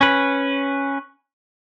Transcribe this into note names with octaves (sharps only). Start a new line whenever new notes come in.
C#4 B4